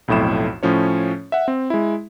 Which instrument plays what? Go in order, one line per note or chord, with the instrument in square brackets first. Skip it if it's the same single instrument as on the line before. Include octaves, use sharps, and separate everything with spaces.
[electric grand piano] B1 F2 A2 E4 E7
A2 F3 C#4 C#5
E5 F#5
C4
G#3 E4